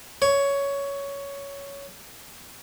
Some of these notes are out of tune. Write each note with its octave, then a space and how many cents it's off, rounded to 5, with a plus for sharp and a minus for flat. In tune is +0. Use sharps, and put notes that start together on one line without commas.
C#5 +10